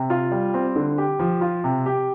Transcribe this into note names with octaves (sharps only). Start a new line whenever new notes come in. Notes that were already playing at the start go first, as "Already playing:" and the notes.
Already playing: C3
F4
G3
C4
D3
G4
F3
F4
C3
G4